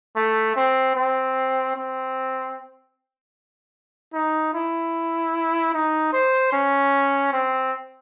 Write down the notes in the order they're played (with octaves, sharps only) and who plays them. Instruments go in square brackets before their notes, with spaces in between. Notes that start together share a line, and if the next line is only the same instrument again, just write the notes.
[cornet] A3
C4
C4
C4
D#4
E4
D#4
C5
C#4
C4